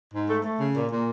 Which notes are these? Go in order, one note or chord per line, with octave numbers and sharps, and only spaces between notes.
G#2
A3
A3
C#3
A#2
A#2